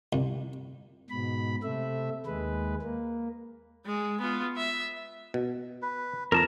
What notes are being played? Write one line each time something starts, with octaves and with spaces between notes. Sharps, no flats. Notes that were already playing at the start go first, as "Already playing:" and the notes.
C2
G#2 B2 B5
C3 A3 E5
D#2 G#3 B4
A#3
G#3
B3 F4
E5
B2
B4
F2 A#4 A5 A#5